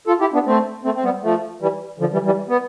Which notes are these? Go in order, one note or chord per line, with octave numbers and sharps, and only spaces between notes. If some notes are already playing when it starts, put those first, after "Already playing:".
F4 A4
E4 G4
B3 D4
A3 C4
A3 C4
C4
G3 B3
F3 A3
E3 G3
D3 F3
E3 G3
E3 G3
B3